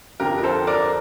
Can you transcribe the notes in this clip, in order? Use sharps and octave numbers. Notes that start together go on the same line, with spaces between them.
F2 D3 F3 G4 A#4
A#4
A4 C5
A#4 D5